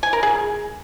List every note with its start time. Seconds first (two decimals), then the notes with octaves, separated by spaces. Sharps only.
0.03 G#5
0.13 A#4
0.23 G#4